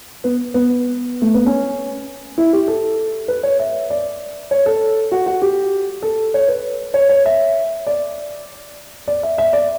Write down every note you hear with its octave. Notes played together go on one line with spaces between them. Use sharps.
B3
B3
A3
B3
C#4
E4
G4
A4
B4
C#5
E5
D5
C#5
A4
F#4
F#4
G4
A4
C#5
B4
C#5
C#5
E5
D5
D5
E5
E5
D5